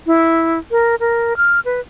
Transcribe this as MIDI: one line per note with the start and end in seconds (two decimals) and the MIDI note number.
0.06 0.58 64
0.71 0.95 70
1.00 1.36 70
1.37 1.60 89
1.65 1.80 71